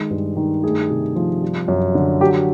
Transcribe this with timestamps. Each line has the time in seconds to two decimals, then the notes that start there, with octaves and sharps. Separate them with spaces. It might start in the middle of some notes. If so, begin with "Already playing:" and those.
Already playing: D#3 G#3
0.10 G2
0.37 D#3
0.63 A3 G#4
0.90 C3
1.16 F3
1.42 G3
1.68 F#2
1.95 D3
2.21 F#3 G4